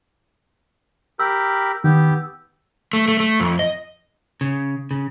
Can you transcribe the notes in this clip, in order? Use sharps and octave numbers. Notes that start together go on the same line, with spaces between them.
G4 A#4 B5 E6
D#3 B3 G4
A3
A3
A3
F2
D#5
C#3
C#3